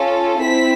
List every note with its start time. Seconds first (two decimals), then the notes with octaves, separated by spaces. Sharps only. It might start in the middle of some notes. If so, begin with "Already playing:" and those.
Already playing: C#4 F4 A4
0.43 C4 E4 B6